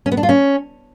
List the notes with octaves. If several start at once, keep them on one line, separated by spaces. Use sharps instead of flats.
C#4
B3
D4
F4
C#4